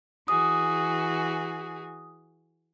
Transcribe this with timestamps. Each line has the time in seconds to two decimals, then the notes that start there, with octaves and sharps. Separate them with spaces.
0.28 E3 F#4 G#4 D#6